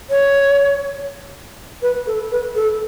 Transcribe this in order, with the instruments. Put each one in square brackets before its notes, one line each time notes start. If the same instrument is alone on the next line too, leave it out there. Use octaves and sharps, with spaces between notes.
[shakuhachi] C#5
B4
A4
B4
A4